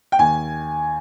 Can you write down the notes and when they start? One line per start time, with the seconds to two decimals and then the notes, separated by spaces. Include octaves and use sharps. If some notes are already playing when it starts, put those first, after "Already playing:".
0.12 G5
0.19 D#2 G#5